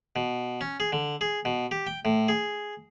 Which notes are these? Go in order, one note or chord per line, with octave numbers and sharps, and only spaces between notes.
B2
C#4
G#4
D3
G#4
B2
G4
G5
A2
G#4